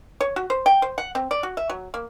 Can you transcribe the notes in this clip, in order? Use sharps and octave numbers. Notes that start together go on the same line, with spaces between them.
C#5
F#4
C5
G5
C5
F#5
C4
D5
F#4
E5
F#3
A#3